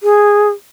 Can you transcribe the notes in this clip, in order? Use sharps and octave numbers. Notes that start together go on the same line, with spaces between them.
G#4